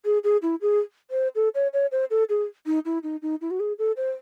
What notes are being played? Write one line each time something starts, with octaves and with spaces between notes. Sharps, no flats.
G#4
G#4
E4
G#4
C5
A4
C#5
C#5
C5
A4
G#4
D#4
E4
D#4
D#4
E4
F#4
G#4
A4
C5